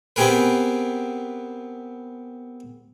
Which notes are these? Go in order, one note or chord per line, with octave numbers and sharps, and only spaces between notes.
B3 C4 G4 G#4 A#4 B4